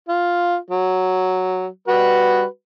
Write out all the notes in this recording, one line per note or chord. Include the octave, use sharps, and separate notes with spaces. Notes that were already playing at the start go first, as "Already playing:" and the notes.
F4
F#3
G3 F#4 B4